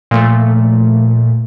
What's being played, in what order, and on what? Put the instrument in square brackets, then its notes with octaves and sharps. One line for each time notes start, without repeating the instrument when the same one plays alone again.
[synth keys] A#2 F3 A3